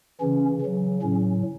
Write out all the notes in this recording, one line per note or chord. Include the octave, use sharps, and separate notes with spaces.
C#3 E3 C#4
C#3 F#3
A2 F#3 C#4